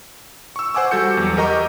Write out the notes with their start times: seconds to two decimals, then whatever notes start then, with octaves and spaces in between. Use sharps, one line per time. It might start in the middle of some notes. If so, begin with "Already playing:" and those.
0.56 C#6 E6
0.75 C5 F#5 G#5 D6 E6
0.91 G3 F#4 A4 G6 C#7
1.17 E2 F#3
1.37 G4 A#4 D#5 A#5 C#6 G6